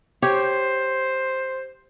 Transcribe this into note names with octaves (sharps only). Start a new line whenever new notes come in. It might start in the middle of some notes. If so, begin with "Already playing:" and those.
G4 C5 C#5